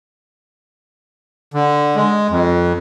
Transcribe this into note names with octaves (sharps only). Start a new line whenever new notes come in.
D3
G#3
F2